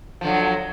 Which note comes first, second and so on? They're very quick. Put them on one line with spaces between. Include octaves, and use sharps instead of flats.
F3 D3 F#3